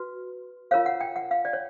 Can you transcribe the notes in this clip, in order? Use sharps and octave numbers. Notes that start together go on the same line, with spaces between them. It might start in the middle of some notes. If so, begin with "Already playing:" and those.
Already playing: F#4 B4
F4 A#4 C#5 F5
F#5
G5
F#5
F5
D5
C#5